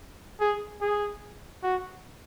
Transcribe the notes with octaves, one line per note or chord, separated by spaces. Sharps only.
G#4
G#4
F#4